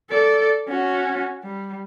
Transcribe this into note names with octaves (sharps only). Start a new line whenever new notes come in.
A4 D5
C#4 F#4
G3